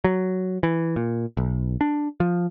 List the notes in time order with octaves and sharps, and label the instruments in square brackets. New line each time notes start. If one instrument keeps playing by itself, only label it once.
[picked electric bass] F#3
E3
A#2
B1
D4
F3